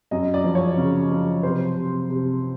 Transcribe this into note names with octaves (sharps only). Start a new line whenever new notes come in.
F#2 D#5
D5
F3
C#5
C#3
F3
C3 C5
C3
C3